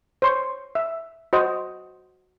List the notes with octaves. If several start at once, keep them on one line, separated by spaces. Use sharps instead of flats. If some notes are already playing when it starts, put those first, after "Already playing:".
C5 C#5 C6 C#6
E5
F#4 C5 D#5